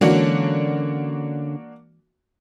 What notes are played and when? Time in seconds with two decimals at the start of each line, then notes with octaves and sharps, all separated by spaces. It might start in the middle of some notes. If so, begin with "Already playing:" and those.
0.01 D3 E3 G#3 A#3 C#4 D4 F#4